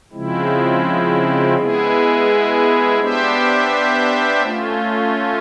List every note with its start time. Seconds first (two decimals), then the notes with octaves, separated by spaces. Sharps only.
0.13 C#3 F3 G#3 C4 E4
1.56 G#3 B3 E4 G#4
2.99 B3 D4 G4 C5 E5
4.43 A3 C#4 F4